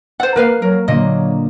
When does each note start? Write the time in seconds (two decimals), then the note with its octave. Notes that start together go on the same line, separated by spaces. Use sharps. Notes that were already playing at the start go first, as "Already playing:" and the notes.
0.20 A4 C5 F#5
0.36 A#3 A#4 B4 F5
0.62 F#3 A#4
0.88 A#2 D3 F#3 A#3 D#5